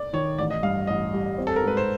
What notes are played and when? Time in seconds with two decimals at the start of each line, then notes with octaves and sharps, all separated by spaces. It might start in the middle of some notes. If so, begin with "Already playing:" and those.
Already playing: D5
0.13 D#3 C#5
0.38 A1 D5
0.51 D#5
0.63 G2 F5
0.87 A1 D#5
1.12 G3
1.38 C4
1.47 A4
1.56 A#4
1.63 G#2 B4
1.77 C5